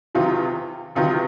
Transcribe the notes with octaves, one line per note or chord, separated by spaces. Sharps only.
E2 C3 D#3 F#3 F4
E2 C3 D#3 F#3 F4